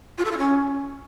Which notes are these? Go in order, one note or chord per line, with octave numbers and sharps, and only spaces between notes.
F4
A4
F4
C#4